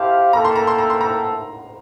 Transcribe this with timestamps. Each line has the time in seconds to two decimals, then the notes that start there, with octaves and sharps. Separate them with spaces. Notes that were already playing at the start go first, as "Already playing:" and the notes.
Already playing: E4 G4 C5 F5 A5
0.33 A#3 E4 A4 E5 G5 A#5
0.45 C6
0.56 A#5
0.67 C6
0.78 A#5
0.90 C6
1.01 A#5